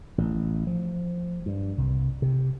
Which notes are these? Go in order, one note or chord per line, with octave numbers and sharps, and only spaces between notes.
A1
F3
G2
C2
C3